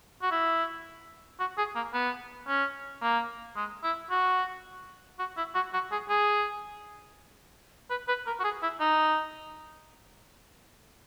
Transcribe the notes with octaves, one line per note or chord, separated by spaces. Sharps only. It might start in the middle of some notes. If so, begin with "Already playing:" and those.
F#4
E4
F#4
G#4
A#3
B3
C#4
A#3
G#3
E4
F#4
F#4
E4
F#4
F#4
G#4
G#4
B4
B4
A#4
F#4
G#4
E4
D#4